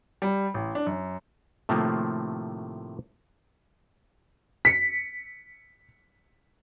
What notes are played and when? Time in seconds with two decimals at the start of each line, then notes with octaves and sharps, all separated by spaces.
0.22 G3
0.54 A1
0.75 D4
0.87 F#2
1.69 A2 C3 D#3 F3 A3 A#3
4.65 B6 C#7